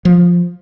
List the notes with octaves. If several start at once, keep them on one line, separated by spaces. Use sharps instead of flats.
F3